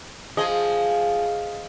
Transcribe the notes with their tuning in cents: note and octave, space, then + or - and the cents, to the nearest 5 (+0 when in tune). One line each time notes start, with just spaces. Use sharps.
F3 +0 G#4 +0 D#5 +0